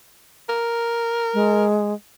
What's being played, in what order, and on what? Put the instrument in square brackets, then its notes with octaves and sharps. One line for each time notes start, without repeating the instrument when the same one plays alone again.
[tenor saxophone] A#4
[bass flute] G#3